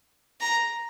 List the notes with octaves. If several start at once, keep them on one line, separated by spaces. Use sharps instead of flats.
A#5